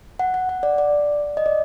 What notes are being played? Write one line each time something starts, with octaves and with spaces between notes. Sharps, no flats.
F#5
F#5
F#5
D5
D5
D#5
D5